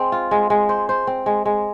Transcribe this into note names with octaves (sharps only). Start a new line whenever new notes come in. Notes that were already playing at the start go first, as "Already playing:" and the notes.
Already playing: G#3 C4
F4
G#3
G#3
C5
C5
C4
G#3
G#3